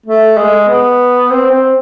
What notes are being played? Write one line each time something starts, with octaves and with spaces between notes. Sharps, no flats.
A3
G#3
B3
C4
C4